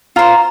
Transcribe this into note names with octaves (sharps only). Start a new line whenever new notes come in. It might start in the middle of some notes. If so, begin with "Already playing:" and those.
F4 C5 A#5